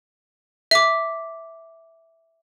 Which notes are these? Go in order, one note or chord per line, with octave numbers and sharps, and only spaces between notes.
E5 D6